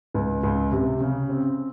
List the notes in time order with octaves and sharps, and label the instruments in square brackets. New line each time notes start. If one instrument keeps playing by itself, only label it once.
[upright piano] C#2
C#2
C3
C#3
C4